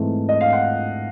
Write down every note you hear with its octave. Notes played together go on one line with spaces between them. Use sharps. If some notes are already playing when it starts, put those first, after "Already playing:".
Already playing: G#2 E3 A3 C4 D#4
D#5
F5
F#5